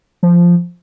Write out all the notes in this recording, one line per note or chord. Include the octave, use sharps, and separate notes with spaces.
F3